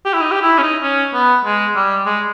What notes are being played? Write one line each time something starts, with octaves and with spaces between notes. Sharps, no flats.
G4
E4
D#4
G4
E4
C#4
D#4
C#4
B3
G#3
G3
G#3